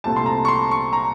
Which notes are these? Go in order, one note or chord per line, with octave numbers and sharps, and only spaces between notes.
C2 A#2 A3 C4 A5
C6
A#5
C#6
C6
C#6
A#5